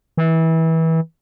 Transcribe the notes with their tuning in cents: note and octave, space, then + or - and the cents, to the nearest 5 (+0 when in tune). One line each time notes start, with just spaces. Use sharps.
E3 -25